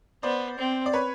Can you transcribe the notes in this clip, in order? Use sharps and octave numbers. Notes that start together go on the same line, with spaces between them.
B3 C5 D5
C4
D5
B4 C#5